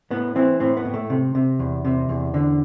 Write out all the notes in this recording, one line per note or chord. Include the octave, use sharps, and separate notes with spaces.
A2 B3
E3 C4
A2 C4
B3
A2
A3
C3
C3
E2
C3
E2
D3